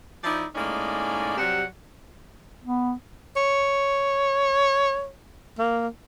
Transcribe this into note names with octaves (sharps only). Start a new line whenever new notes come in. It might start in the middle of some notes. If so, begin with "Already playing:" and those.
F3 D#4 E4 D5
A2 G#3 A#3 C#4 D#4 D5
C3 F#3 G3 C4 G4 F#5
B3
C#5
A#3